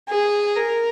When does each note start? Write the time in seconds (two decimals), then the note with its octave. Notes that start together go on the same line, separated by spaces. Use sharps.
0.09 G#4
0.56 A#4